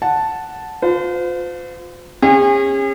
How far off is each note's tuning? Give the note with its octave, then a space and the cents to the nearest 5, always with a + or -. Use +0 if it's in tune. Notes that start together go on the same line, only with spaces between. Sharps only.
F#5 +0 A5 +0
F4 +30 C5 -40
C#4 -30 G#4 -40